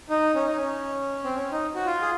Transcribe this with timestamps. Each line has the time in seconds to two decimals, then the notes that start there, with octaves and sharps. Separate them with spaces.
0.09 D#4
0.35 C#4
0.46 D#4
0.56 C#4
1.24 C4
1.36 C#4
1.52 D#4
1.75 F#4
1.86 F4
2.02 G#4